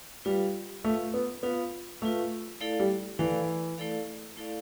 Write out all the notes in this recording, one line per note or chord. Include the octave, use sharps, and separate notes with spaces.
G3 F4 B4 F5
A3 F4 B4 F5
B3
B3 F4 B4 F5
A3 F4 B4 F5
A3 E4 A4 D5 F5
G3
E3 A3 E4 A4 D5 F5
A3 E4 A4 D5 F5
A3 E4 A4 D5 F5